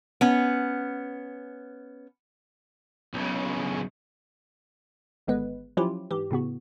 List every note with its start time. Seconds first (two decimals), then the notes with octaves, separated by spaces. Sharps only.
0.21 B3 C#4
3.14 B1 C#3
5.27 G#1 D3 G#3 B3 B4
5.77 F3 F#3 C#4 E4 F4 G4
6.11 G#2 E3 G4
6.31 A2 C#3 B3 F#4